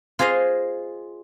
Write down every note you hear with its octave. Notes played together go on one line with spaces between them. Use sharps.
F4 G#4 C5 D#5 F5